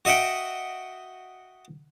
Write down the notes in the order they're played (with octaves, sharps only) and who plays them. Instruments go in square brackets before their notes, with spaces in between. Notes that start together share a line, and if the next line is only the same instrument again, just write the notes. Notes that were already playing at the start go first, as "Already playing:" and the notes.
[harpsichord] F#4 D#5 E5 F#5 G5